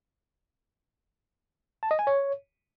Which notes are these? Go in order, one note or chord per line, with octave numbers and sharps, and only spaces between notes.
A5
D#5
G#5
C#5